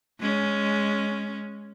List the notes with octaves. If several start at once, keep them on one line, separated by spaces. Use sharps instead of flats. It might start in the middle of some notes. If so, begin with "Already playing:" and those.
G#3 C#4